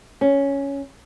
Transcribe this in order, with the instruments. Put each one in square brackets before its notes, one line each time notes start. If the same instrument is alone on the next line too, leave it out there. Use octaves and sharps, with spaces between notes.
[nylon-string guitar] C#4